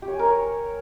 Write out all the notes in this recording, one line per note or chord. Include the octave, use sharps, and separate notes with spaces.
G4
C#5
G#5
A#4
C#5